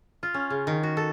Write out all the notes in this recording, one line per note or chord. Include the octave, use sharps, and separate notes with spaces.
F4
C#4
C#3
D#3
F#4
A4